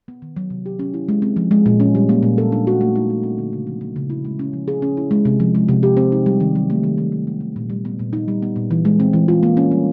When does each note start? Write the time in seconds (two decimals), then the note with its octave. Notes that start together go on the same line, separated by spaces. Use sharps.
0.08 B3
0.22 D#3
0.37 F#3
0.50 C3
0.66 G4
0.79 C#4
0.94 E4
1.08 G#3
1.22 C4
1.36 F3
1.51 G#3
1.66 A#2
1.80 C#4
1.95 G3
2.09 A#3
2.23 A#2
2.38 A4
2.52 D4
2.67 F#4
2.81 A3
2.96 D#4
3.10 G3
3.23 C4
3.38 D3
3.53 C#3
3.67 F3
3.81 A#3
3.96 C#3
4.10 E4
4.25 G#3
4.39 C#4
4.53 F3
4.68 G#4
4.82 C#4
4.97 E4
5.11 G#3
5.25 C3
5.40 F3
5.55 G#3
5.69 C3
5.83 G4
5.97 C4
6.12 D#4
6.26 G3
6.40 D#3
6.55 F#3
6.70 A3
6.84 D#3
6.98 D#3
7.12 F#3
7.27 B3
7.41 D#3
7.56 A#2
7.70 G3
7.85 B3
7.99 A#2
8.13 D#4
8.28 G3
8.42 B3
8.56 A#2
8.71 E3
8.85 G#3
9.00 C4
9.13 E3
9.28 F4
9.43 A#3
9.57 C#4
9.71 G3